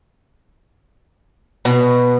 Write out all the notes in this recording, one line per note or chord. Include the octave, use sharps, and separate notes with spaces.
B2